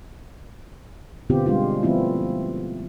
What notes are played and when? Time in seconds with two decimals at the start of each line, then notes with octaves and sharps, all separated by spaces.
1.30 B2 D3 B3 C4 F4 G4
1.46 G3 G#3 D4 F4
1.83 F3 A3 B3 C4 E4 F4